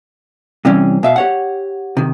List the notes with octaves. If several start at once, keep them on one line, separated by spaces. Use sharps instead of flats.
C3 E3 G3 C4 C#4
B2 E5 F5
G4 C#5 F#5
C3 D#3